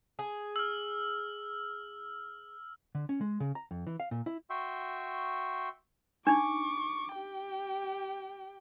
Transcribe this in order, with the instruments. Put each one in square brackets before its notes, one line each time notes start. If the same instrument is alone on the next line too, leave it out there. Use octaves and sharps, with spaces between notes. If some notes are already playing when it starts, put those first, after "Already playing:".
[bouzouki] G#4
[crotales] E6 F6
[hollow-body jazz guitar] D3
C#4
G#3
C#3
A#5
F2
E3
F5
A#2
E4
[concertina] F#4 E5 G5 C6 C#6
[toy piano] D4 D#4 [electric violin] C#6 D6
[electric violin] G4 G5